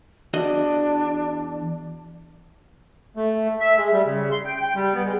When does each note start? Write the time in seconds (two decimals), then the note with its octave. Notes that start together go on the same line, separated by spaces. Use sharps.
0.33 E2 D4 F#4 D#5
3.16 A3
3.60 E5
3.77 G#3
3.92 G3
4.06 C#3
4.32 C6
4.45 G5
4.62 G5
4.75 G3
4.93 B3
5.05 G#3